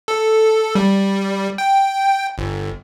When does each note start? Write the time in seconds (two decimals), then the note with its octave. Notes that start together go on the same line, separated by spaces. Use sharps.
0.08 A4
0.75 G3
1.58 G5
2.38 G1